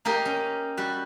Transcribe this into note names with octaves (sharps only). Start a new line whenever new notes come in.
A#3 D#4 G4 A#4
C#4
G3 F#4